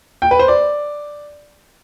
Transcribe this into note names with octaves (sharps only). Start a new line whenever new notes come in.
G5
B4
C5
D5